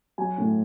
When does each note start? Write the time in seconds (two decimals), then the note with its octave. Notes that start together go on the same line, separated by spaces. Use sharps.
0.18 F#3 G#5
0.38 A2